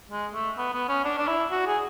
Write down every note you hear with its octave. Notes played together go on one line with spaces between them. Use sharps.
G#3
A3
B3
B3
C#4
D4
D4
E4
F#4
G#4